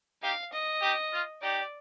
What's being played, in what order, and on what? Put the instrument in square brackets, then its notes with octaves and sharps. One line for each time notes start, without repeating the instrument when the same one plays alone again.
[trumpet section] D#4 G4 [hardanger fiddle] F5
[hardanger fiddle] D#5
[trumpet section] D#4 G4
F4
[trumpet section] D#4 G4 [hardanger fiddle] D5